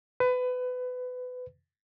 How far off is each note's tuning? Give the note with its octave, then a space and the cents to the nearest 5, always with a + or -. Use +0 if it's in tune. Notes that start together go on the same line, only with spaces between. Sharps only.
B4 +25